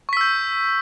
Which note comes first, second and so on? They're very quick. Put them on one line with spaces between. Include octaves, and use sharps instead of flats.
C#6 B6 E6 G6